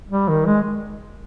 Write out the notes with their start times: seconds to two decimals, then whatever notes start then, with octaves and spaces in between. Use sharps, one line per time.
0.10 G3
0.29 D#3
0.46 G#3